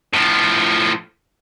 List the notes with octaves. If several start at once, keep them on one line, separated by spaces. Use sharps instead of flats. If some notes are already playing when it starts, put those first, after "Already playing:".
A2 F3